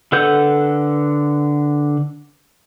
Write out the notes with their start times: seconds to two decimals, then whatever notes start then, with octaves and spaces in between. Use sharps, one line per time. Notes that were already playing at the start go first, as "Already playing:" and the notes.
0.12 D3 A4 B4 F#5 G6